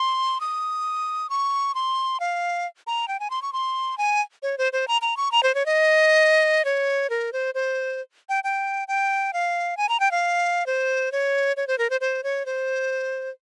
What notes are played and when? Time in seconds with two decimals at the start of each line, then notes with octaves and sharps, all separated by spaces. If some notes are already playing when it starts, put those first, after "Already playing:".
Already playing: C6
0.41 D#6
1.30 C#6
1.75 C6
2.20 F5
2.87 A#5
3.08 G5
3.20 G#5
3.30 C6
3.42 C#6
3.53 C6
3.98 G#5
4.43 C#5
4.58 C5
4.73 C5
4.88 A#5
5.02 A#5
5.17 C#6
5.32 A#5
5.43 C5
5.55 C#5
5.66 D#5
6.65 C#5
7.10 A#4
7.33 C5
7.54 C5
8.29 G5
8.44 G5
8.88 G5
9.33 F5
9.77 G#5
9.89 A#5
10.00 G5
10.11 F5
10.66 C5
11.12 C#5
11.57 C#5
11.67 C5
11.78 A#4
11.90 C5
12.01 C5
12.24 C#5
12.46 C5